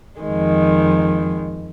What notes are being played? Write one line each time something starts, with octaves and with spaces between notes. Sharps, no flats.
F2 D#3 G#3